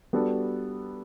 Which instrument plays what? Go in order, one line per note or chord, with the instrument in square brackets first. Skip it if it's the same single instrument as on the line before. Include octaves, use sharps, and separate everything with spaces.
[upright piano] G3 B3 D4 F#4 A4